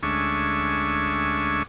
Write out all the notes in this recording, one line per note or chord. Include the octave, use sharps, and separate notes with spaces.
D2 G#3 C#4 D4 E5 C#6